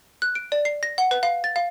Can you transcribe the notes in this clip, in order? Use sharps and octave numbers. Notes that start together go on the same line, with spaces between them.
F#6
D7
D5
C7
A#6
F#5
B4
F5
A6
F5